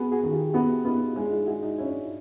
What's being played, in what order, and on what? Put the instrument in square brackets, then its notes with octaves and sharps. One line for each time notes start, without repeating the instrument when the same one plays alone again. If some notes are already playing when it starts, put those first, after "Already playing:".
Already playing: [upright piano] B3 [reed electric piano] F#4 G#4
[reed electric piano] F#4 G#4
[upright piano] D#3
[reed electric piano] F4 G4
[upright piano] B3 [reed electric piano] E4 F#4
[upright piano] B3 [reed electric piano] D#4 F4
[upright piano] G#3 [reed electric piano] D4 E4
[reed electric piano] D#4 F4
[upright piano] G#3 [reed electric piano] E4 F#4
[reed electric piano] D#4 F4
[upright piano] C#4 [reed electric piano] D4 E4